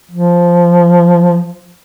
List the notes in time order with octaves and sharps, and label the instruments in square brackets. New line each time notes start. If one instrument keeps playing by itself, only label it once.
[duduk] F3